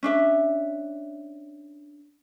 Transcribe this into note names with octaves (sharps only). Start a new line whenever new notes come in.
C#4 D4 E5